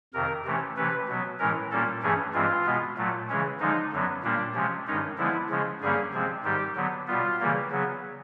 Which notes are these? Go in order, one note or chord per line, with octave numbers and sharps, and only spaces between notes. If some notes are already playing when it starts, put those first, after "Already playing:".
F2 C3 D#3 A#4
C3 E3 A3 C#4
C3 E3 A3 C#4 B4
B2 F#3 B3
A2 E3 G#3 C#4 A#4
A#2 G3 A#3 C#4 A4
G2 E3 A3 C#4 G#4
G2 E3 G#3 C4 F4
B2 G#3 B3
A#2 F#3 A3
C#3 E3 G#3 C#4
D3 F3 G#3 D#4
F#2 D3 F#3 B3
A#2 G3 A#3 D4
C3 F3 G#3 C#4
G2 D#3 G#3 C#4 D#4
D3 F3 G#3 B3 E4
C#3 F3 G#3 C#4
G2 D3 G3 A#3 C#4 G#4
C3 F3 G#3 C4
G#2 D#3 G3 G4
D3 F#3 B3
B2 G3 B3 F4
C#3 E3 G3 A#3
C#3 F#3 B3